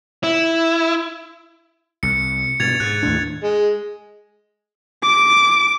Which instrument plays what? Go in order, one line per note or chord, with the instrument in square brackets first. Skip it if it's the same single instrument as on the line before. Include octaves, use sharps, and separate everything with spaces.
[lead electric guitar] E4
[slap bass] C2 [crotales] C#7
[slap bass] G2 B2 [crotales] G#6 A6 F7
[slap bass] G#2 [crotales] F#6
[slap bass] D#2 A2 D4
[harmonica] G#3
[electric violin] D6 D7